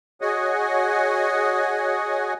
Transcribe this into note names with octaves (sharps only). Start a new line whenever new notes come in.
F#4 G#4 C#5 D#5 F#5 G#5